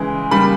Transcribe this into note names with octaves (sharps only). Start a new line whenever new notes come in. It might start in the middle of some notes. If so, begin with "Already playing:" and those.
Already playing: C#3 E3 G#3
C#3 G3 A#3 B5